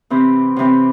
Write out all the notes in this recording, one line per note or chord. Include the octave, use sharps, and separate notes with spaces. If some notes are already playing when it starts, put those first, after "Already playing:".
C3 E3 C4
C3 E3 C4